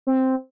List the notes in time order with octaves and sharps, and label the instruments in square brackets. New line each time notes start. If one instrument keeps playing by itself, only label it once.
[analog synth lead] C4